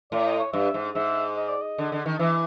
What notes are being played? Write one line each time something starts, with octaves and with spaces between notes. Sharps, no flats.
A2 D5
D#5
C#5
G2 E5
G#2
G#2 E5
D#5
D5
D#5
D3
D3
D#3
E3 E5